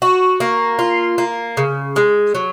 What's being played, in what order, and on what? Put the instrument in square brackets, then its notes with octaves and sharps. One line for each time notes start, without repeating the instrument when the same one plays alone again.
[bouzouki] F#4
A#3
F4
A#3
C#3
G#3
F#3